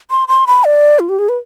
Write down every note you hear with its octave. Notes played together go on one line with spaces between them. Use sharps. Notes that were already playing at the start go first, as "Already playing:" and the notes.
C6
C6
B5
D5
F4
G4
G#4
B4